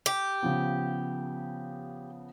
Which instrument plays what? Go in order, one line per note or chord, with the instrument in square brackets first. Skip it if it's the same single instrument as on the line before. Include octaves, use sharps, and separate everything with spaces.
[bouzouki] G4
[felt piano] C#3 F3 B3